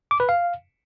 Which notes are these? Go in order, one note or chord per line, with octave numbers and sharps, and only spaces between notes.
D6
B4
F5